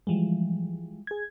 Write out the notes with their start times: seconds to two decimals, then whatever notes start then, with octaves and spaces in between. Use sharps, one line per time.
0.07 E3 F3 G3 G#3
1.07 G#4 G#6